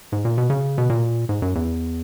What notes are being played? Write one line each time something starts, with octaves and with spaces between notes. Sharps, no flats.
G#2
A#2
B2
C#3
B2
A#2
G#2
F#2
E2